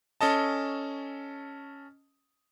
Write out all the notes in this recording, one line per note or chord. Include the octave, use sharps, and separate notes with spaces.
C#4 A4 D#5 A5